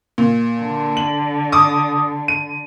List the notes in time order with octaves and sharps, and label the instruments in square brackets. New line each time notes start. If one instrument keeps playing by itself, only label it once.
[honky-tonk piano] A#2
[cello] D3
[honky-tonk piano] F#7
D6 D#6
D#7